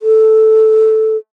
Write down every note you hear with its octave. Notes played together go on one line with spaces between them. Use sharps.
A4